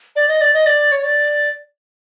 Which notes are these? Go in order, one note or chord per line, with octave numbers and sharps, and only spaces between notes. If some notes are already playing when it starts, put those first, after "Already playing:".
D5
D#5
D5
D#5
D5
C#5
D5